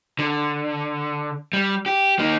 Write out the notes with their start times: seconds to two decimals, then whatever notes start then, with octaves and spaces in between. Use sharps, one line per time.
0.19 D3
1.53 G3
1.86 G4
2.19 A#3 D#4